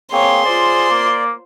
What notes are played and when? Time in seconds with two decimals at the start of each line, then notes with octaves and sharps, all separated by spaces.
0.13 A#3 C4 G#4 C#5 C6
0.45 F4 C5 D5
0.90 A#3